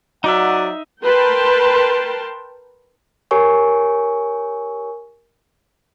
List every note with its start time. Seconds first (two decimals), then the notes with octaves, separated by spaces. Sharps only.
0.24 F#3 D#4 D5 E5 F#5
1.03 A#4 B4 G5 A5 C6
3.31 G4 A#4 C#5 G#5 C#6